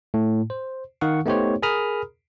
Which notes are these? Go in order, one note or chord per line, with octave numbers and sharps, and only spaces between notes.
A2
C5
D#3 F5 F#5 C#6
A3 B3 D#4 G4 C5 C#5
G#4 A#4 A#5 B5 D#6 F6